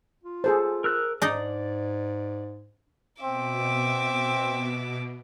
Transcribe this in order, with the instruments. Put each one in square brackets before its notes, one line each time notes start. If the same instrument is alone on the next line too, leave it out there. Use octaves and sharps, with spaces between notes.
[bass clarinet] F4
[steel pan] G#4 A4 C5
[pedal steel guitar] A#4 E6 F#6
[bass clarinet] G#2 [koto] D4 D#4 D#5 [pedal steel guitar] D5
[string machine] B2 [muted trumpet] C4 [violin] E5 D6